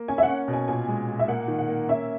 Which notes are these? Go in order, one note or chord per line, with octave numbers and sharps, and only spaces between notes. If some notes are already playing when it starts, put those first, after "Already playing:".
Already playing: A#3
C#4 G#5
E5
F#5
C#4
B2
G#5
A#2 G#5
G#3
A#2
E5
A#3 F#5
D#3
F#5
A#3
C#4 E5